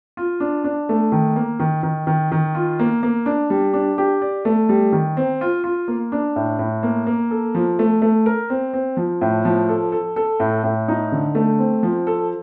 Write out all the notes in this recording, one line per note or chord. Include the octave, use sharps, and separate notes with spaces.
F4
D4
D4
A3
D#3
A#3
D#3
D#3
D#3
D#3
F4
A#3
A#3
D4
G3
D4
G4
D5
A3
G3
D#3
C4
F4
F4
A#3
D4
A2
A2
A#3
A#3
A4
F3
A3
A3
A#4
C4
C4
F3
A2
F3
A4
A4
A4
A2
A2
D#4
D3
A3
C4
F3
A4